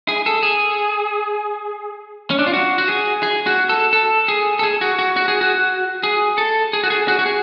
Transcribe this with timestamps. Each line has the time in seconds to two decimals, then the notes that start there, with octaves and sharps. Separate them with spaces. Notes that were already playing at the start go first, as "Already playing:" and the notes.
0.09 G#4
0.26 A4
0.43 G#4
2.30 C#4
2.39 D4
2.46 F4
2.53 F#4
2.78 F#4
2.88 G#4
3.23 G#4
3.46 F#4
3.69 A4
3.93 A4
4.28 G#4
4.59 A4
4.63 G#4
4.81 F#4
4.99 F#4
5.16 F#4
5.28 G#4
5.41 F#4
6.03 G#4
6.38 A4
6.73 G#4
6.83 F#4
6.90 G#4
7.08 F#4
7.19 F#4
7.26 G#4